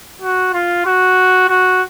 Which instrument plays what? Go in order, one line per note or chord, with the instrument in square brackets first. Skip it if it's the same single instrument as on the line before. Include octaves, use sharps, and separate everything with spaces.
[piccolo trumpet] F#4
F4
F#4
F#4